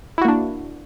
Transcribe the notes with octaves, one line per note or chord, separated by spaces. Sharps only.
A#3 D4 E4 F#4